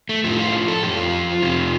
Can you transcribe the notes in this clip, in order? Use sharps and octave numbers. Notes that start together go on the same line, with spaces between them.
A3
A2 F3 A3
F4
A4
F2 F3 G4
F4
F2 C3 F3